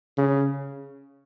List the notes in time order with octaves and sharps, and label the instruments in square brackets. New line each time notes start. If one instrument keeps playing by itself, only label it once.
[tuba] C#3